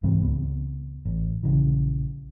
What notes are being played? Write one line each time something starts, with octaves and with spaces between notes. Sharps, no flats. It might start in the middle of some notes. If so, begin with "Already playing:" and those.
C2 G#2 E3 C4
C#2 B3
A1
A#1 C#3 E3